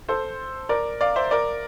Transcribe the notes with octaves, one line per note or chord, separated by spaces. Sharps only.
A4 C5
A#4 D5
D5 F5
C5 E5
A#4 D5